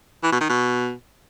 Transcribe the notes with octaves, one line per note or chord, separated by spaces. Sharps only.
E3
B2
D#3
B2